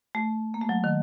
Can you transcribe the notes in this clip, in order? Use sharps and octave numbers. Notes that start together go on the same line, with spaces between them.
A3
A#3
A3
F#3
D#3